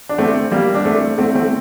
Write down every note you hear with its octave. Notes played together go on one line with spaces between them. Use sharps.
D4
A3 C4
G3 A#3
D4
A3 C4
A3 C4
A3 C4